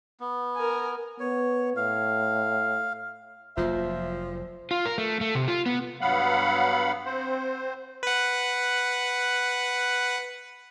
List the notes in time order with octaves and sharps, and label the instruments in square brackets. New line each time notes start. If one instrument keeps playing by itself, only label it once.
[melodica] B3
[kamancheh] A#4 G#5
[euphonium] B3 [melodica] C#5
[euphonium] A2 [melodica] F5
[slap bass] F1 F#3 A#3 [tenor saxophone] F3 [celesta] F4 [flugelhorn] E5
[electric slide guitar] F4
A#4
A3
A3
C3
F4
B3
[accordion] G2 F#3 B3 F5 F#5 B5
C4 C5
[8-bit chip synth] B4 F#5